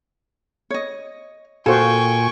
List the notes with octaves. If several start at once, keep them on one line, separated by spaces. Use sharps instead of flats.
C#5 D#5
A#2 F4 F#4 A4 C5 G5 G#5 C#6